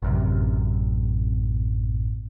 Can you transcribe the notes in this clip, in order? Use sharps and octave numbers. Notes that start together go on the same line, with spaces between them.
A1 F#2 C3